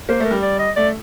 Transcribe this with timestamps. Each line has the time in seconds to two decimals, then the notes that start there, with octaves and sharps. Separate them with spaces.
0.09 A#3 C5
0.20 A3
0.25 A#4
0.31 G3
0.42 D5
0.59 D#5
0.76 A3 D5